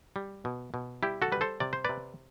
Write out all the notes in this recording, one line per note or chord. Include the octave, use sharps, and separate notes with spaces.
G3
B2
B2
G3 E4 G4
F#4 A4
G3 B4
A4 C5
C3 D5
C5
C3 B4 D5